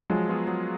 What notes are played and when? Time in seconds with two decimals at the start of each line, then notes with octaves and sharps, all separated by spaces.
0.10 F3 F#3 G#3
0.29 B3 F4 G#4
0.47 F#3